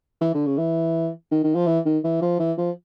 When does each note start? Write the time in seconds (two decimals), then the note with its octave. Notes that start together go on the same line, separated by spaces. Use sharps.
0.21 E3
0.34 D3
0.46 C#3
0.58 E3
1.31 D#3
1.43 D#3
1.55 F3
1.67 E3
1.86 D#3
2.04 E3
2.21 F3
2.39 E3
2.58 F3